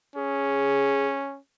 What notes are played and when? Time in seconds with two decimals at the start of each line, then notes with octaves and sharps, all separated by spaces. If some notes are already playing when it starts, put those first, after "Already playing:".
0.16 C#4 G#4